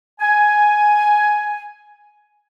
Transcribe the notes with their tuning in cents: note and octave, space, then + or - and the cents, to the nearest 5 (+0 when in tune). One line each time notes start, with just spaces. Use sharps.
G#5 +10